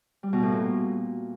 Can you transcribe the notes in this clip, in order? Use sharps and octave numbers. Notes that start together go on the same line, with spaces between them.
G3
B2
A2
A#2